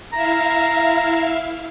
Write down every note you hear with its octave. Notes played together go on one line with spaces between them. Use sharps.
E4 E5 F5 A#5